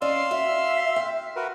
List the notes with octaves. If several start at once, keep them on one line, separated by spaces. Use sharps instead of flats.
C#4 D5 D#5 F5 C6 E6
F#4 E5
G5
F#4 A#4 B4